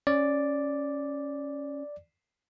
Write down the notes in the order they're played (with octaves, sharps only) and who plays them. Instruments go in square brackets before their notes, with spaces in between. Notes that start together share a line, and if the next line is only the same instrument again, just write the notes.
[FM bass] C#4 [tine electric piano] D5